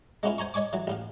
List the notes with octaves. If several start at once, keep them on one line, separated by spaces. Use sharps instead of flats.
G#3 A#3 B3 C#4 E4 F4
C5 G#5 A#5 C#6
C#5 D#5 G#5 C#6 D6
E3 F#3
A1 A2 F5